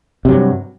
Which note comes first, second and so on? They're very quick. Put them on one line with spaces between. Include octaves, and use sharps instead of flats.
C3 F#3 G2